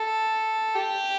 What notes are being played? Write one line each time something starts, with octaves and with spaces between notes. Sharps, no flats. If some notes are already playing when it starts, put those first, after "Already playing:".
Already playing: A4
G4